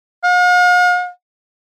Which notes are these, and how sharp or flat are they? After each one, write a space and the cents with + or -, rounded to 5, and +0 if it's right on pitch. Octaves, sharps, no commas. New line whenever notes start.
F5 +45